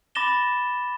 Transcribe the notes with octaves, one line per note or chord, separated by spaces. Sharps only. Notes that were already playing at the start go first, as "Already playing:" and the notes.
B5 D6 A6 A#6 E7 G7